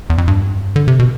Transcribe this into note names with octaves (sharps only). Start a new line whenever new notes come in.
E2
F2
G2
D3
C3
B2